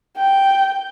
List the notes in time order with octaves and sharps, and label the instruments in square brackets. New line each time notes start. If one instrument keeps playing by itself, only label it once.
[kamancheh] G5